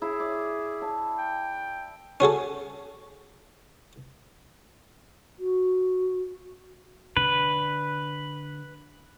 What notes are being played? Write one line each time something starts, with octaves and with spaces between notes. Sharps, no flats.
E4 G#4
D5
A5
G5
C#4 F#4 G#4 A4
F#4
D3 B4